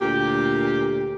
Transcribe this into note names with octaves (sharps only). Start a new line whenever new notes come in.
D2 A#2 G4